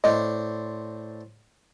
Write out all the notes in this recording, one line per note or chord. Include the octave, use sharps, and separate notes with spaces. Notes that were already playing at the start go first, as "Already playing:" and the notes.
A2 C4 D4 D#5